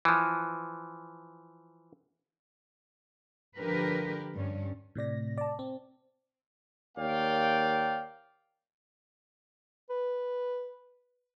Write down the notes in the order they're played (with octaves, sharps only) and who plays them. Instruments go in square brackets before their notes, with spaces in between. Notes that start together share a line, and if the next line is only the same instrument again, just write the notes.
[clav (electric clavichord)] E3 F3
[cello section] D3 F3 G4 A#4 B4
G2 C#4
[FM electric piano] A2 C3 D5 A#6
D5 A5
C4
[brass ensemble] D#2 A#3 C#5 D5 F5 G5
[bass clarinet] B4